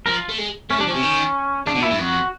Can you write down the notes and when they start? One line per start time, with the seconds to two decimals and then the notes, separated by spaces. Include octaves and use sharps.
0.06 F3 A#4
0.17 F4
0.29 A3
0.38 G#3
0.70 A3 C#4
0.78 G3 D4
0.87 F3
0.90 C3 C#4
1.03 D#3
1.66 C#3 D4
1.75 B2
1.83 A#2 E4
1.91 G2
1.99 F2 F#4